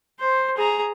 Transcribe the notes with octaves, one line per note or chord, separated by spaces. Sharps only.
C5
G#4 A#5